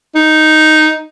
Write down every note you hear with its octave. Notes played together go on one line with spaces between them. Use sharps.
D#4